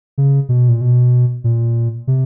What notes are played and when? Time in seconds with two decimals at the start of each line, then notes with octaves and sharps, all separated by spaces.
0.18 C#3
0.49 B2
0.69 A#2
0.81 B2
1.44 A#2
2.07 C3